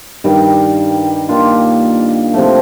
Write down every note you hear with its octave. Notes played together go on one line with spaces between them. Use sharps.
G2 D#3 G3
D#3 A#3 D4 F4
C3 F3 A3